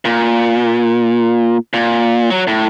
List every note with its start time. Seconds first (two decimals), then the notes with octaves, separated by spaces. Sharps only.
0.05 A#2
1.74 A#2
2.30 F#3
2.47 A2